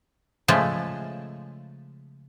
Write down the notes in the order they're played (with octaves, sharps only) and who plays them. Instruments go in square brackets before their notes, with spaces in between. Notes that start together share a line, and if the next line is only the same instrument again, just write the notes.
[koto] C#3 F3 G#3 A3